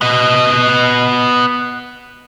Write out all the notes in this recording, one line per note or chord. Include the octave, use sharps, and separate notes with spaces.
B3 D#5